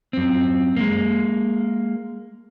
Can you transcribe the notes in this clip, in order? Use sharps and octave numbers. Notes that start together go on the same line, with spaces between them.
F#2 C4
G#3 A#3